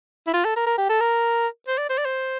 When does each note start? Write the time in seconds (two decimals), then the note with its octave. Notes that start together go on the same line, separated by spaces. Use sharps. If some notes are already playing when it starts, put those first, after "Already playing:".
0.27 E4
0.34 F4
0.45 A4
0.56 A#4
0.66 A#4
0.78 G4
0.89 A4
1.00 A#4
1.67 C5
1.78 D5
1.90 C5
1.98 D5
2.05 C5